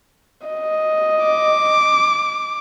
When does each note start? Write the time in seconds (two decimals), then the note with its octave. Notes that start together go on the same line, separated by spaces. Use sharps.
0.46 D#5
1.26 D6